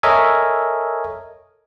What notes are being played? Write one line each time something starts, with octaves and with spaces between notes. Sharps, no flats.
A4 A#4 C#5 D#5 E5 G#5